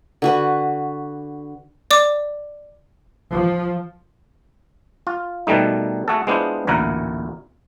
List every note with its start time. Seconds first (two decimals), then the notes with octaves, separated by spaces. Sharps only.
0.22 D3 F#4 B4
1.91 D5 D6
3.31 F3
5.07 F4
5.47 B2 D#3 G3 A3 D#4
6.08 A3 F#4 G#4 A4
6.27 G#3 B3 D4 E4 F4 C5
6.67 A1 D2 A#2 E4 A#4 F#5